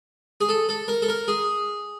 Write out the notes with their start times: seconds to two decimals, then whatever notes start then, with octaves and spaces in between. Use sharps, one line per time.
0.41 G#4
0.49 A4
0.69 A4
0.88 A#4
1.02 A4
1.09 A#4
1.28 G#4